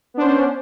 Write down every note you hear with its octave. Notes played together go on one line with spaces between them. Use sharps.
B3 C#4 D4 C5